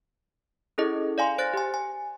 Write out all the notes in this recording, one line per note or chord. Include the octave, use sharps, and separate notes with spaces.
C#4 E4 G#4 A4 D#5
D5 F5 G#5 C6
C5 F#6 A6 A#6
G4 G#5
G#5